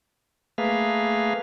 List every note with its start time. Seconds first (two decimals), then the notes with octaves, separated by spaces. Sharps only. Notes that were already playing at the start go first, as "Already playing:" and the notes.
0.58 A3 A#3 G#4 B4 F5